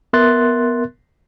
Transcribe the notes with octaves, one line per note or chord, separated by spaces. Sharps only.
B3 A#4 E5 C6 F#6 A6